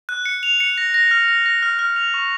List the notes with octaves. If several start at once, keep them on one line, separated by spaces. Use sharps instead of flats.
F#6
C#7
F7
C#7
A#6
A#6
F6
A#6
A#6
F6
F6
F7
C#6